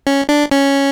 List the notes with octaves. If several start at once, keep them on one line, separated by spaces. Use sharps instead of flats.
C#4
D4
C#4